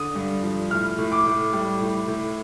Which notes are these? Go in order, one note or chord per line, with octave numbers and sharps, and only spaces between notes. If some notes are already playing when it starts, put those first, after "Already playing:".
Already playing: D3 D#6
G2
F3
A2 F6
A2
D6
A2
G3
A2
A2